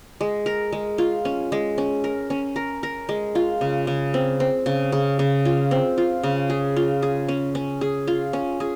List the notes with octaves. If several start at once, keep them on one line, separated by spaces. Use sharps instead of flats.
G#3
A#4
G#3
F4
C#4
G#3
C#4
A#4
C#4
A#4
A#4
G#3
F4
C#3
C#3
C4
C4
C#3
C#3
C#3
F4
C4
F4
C#3
G#4
F4
G#4
C#4
C#4
G#4
F4
C#4
G#4